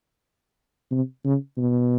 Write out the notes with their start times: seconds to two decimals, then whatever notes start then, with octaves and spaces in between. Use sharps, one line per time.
0.91 C3
1.25 C#3
1.58 B2